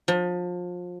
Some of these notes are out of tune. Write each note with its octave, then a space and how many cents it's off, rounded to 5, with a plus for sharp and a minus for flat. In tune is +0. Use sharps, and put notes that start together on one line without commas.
F3 +30